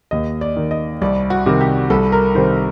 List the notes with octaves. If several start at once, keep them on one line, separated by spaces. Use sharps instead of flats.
D#2 D#5
D5
D#3
D#5
C2 D5
F#4
C3 D#3
G4
C2 A4
A#4
C3 D#3 C5